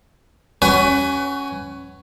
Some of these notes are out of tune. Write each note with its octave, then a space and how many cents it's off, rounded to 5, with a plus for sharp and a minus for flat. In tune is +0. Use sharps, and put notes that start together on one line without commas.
C#4 +0 F#4 +30 B4 +20